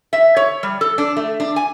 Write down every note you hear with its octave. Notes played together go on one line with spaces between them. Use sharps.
E5
C#5
G3
A4
D4
A3
D4
G#5